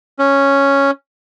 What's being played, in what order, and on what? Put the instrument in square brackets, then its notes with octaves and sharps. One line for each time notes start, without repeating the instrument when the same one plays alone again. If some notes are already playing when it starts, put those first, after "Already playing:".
[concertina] C#4